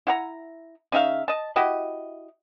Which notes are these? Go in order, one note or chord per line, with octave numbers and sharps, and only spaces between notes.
E4 F#5 A#5
C#3 D#4 E5 F5
D#5 A5
E4 F#4 G4 D#5